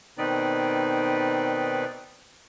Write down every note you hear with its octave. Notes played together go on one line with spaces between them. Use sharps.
B2 D#3 C4 D#4 B4 D5